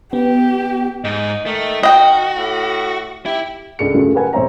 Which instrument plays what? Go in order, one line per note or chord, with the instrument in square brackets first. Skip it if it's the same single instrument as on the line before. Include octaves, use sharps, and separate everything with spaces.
[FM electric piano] B3 [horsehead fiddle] G4
[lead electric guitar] G#2 [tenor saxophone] D#4
[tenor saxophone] D#3 [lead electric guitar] A3
[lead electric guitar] F#4 [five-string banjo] D#5 G5
[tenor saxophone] A2
[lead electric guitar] E4 E5 [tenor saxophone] G4
[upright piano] C#2 D4 A4 C#7
F#2 C#3 F3 A3
G4 A#4 B4 F#5 G#5
E1 F2 C5 C#5 E5 A#5